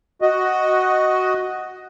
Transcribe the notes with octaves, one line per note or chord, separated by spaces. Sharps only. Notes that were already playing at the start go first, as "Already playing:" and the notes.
F#4 D#5